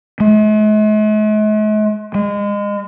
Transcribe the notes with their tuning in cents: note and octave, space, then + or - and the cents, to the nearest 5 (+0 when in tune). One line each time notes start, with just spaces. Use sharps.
G#3 +45
G#3 -30